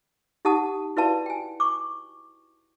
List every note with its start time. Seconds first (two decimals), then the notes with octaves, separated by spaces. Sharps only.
0.45 D#4 G4 F#5 A5 D#6
0.97 E4 F#4 B4 D5 F5 A5
1.26 G5 G#5
1.60 C#6 D6